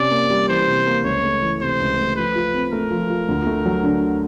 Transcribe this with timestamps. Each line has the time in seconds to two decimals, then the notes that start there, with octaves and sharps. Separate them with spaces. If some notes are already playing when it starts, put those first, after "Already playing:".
Already playing: C3 C#4 D5
0.11 A#3
0.30 G3
0.48 E3 C5
0.67 C3
0.86 A#3
1.04 C#2 C#5
1.23 A3
1.42 E3
1.61 C3 C5
1.80 C#2
1.97 A3
2.16 F3 B4
2.36 F4
2.54 C4
2.73 A3 A#4
2.90 F3
3.10 F4
3.28 D2
3.47 A3
3.66 F#3
3.84 D3